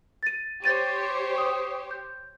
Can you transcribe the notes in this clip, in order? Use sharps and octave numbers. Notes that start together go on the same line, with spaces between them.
A6 D#7
G4 C5 C#5 G6 A6 D#7
C#6 D#6
G6